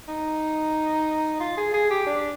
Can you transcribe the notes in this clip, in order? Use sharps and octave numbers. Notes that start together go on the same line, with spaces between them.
D#4
F4
G#4
G#4
G4
D4